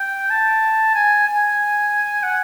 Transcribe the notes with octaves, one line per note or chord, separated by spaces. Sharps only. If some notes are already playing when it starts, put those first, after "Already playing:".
Already playing: G5
A5
G#5
G#5
F#5